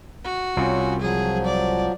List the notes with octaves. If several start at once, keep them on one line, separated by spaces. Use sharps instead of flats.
F#4
C2 C3 C#4 F4
F3 F#3 G#4
D5